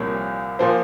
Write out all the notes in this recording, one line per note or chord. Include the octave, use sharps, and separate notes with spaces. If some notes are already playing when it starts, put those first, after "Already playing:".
Already playing: C2 A#2 F3 A#3 C#5
A#2 F3 A#3 C5